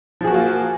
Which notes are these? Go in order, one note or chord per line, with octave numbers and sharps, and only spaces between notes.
F3 A#3 F4 F#4 G#4